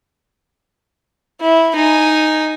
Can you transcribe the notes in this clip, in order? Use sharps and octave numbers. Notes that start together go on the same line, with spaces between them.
E4
D#4 G#5